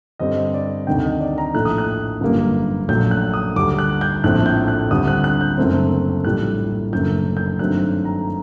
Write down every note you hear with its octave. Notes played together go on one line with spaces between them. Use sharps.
G2 D3 G3 C4 D#5
D5
D2 C3 D#3 G5
D#5
D5
A#5
A#1 A2 A3 F#6
D#6
F#6
G1 F#2 D3 G3 A#3
A#1 A#2 F#3 A3 G6
F#6
D#6
D2 D3 G3 D6
F#6
G6
A#1 A2 A3 C4 F#6
G6
F#6
D2 D3 G3 C4 D#6
F#6
F#6
G6
F#1 F#2 D3 A3 C4
A#1 A2 G3 F#6
F#1 F#2 D3 A3 G6
G6
G2 D#3 F#3 A3 C4 F#6
A#5